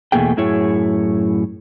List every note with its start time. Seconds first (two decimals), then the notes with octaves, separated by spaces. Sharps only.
0.12 E2 B2 A3 A#3 G#4 G5
0.37 F#2 A2 E4 G#4 C#5